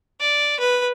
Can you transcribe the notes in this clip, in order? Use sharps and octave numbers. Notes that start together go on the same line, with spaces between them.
D5
B4